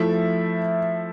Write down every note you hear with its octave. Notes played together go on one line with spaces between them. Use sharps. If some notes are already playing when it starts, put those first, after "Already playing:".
Already playing: F3 A3 E4 E5